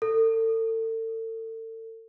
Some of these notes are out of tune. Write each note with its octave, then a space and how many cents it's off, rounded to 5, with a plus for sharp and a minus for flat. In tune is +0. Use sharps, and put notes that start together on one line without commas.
A4 +35